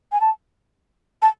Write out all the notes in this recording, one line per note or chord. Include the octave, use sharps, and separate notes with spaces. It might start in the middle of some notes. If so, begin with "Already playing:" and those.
G#5
A5
A5